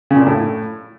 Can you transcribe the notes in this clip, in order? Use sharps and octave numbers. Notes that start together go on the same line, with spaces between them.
C#3
A#2
D4
A2